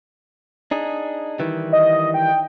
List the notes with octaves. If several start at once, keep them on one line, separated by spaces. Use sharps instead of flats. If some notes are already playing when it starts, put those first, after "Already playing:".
D4 D#4 G#4
D#3 E3 G3
D#5
G5